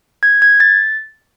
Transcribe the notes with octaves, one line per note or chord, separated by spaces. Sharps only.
G#6
G#6
A6